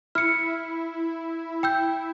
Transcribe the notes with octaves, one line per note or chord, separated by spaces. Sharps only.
E4 F6 C#7
G5 E6 G6